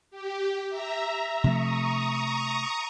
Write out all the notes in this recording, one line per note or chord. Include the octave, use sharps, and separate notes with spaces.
G4
E5 A#5
C3 F3 A3 A#5 C#6 D#6